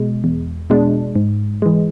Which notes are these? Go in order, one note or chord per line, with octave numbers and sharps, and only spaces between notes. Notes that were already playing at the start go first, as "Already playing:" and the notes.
Already playing: B2 G#3
E2
B2 G#3 D4
G#2
E3 G#3